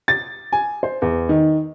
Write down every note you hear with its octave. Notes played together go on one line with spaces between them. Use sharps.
A6
G#5
C5
E2
D#3